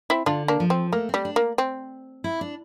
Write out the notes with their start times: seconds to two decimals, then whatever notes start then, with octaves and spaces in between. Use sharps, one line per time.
0.10 C4 E4
0.26 D3 D4 F4
0.48 A#3 D4
0.60 F3
0.70 C4
0.93 A3 A#3
1.09 G3 C4
1.25 D4
1.36 A#3
1.58 C4
2.24 E4
2.41 D4